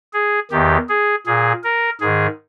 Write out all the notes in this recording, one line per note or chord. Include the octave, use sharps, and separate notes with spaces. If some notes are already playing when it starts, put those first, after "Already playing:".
G#4
E2 D#3 G4
G#4
A#2 G#4
A#4
G#2 D#3 G#4